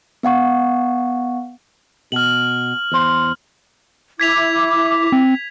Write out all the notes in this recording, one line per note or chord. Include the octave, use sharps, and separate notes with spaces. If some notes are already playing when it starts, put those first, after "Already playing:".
B3 F5 F#5 C#6
B2 F6 F#7
E2 C5
E4 D6 G#6 B6 F7
C4